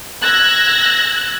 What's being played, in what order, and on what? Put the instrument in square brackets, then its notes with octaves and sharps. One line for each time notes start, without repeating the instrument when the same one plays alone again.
[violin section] E6 F#6 G#6 A#6